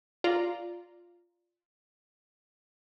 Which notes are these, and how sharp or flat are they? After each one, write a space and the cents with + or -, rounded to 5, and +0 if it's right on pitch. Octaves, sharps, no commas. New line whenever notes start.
F4 +0 D5 +0 A#5 +0